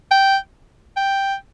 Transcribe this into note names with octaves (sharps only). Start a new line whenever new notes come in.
G5
G5